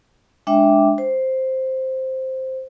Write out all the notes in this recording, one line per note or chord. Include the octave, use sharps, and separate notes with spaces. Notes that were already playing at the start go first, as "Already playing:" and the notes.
G#3 D4 E5 G5 D6
C5